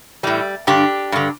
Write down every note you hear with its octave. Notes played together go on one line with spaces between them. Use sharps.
A2 E3 G3
G2 D3 D4 G4
G2 D3